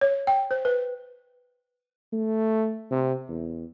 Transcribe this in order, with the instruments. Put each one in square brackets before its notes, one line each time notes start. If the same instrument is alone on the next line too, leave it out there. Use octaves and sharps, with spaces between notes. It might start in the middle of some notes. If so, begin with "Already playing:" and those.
[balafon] C#5
G5
C5
B4
[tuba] A3
C3
E2